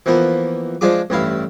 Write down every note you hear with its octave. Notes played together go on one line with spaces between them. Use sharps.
E3 F3 A#3 B3
F3 G#3 D4 F4 G#4 D6
A1 G2 E4 F5